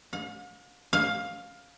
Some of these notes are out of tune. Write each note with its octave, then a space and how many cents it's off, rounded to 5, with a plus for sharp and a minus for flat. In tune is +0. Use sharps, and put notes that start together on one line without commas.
F5 +45
F5 +15